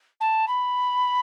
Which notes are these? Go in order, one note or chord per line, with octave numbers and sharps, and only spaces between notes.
A5
B5